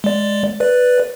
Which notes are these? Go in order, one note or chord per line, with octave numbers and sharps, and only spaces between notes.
G#3 D5
B4 D5